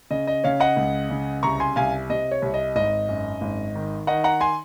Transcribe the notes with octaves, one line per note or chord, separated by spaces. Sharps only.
C#3 D#5
D#5
C#3 C#5 F5
D#5 F#5
C#2
C#3
C2 A#5 C#6
G#5 C6
C2 F5 G#5
C3 D#5
C#5
C2
D#5
G#1 D#5
F#2
G#1
D#3
D#3 D#5 F#5
F#5 A#5
G#5 C6